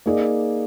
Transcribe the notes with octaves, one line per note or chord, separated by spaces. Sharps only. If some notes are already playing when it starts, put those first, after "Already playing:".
A#3 D#4 G#4 D5